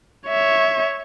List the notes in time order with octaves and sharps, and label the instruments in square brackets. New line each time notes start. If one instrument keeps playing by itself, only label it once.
[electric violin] C#5 E5